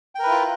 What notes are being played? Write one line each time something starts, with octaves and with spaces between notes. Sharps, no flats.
E4 F4 A#4 B4 G5